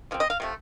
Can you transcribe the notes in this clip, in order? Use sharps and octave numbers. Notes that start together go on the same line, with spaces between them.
C#3 F3 C4
D#5
F5
C3 F3 A3